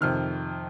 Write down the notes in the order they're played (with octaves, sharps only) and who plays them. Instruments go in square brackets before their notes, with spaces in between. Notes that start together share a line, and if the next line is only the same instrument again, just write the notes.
[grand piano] F2 C3 D#3 F6